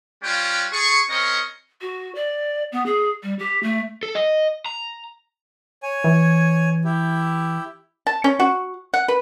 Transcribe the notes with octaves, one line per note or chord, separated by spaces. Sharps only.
G3 C#4 F4 B4 G5
G#4 A4 C#6
C4 C#4 A#4 D#5 C#6
F#4
D5
B3
G#4
G3
G4
A3
A4
D#5
A#5
C#5 G#5
E3
E4 G4
A5
C#4
F#4
F#5
B4